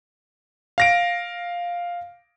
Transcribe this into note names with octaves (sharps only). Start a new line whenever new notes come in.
F5 A#6 D7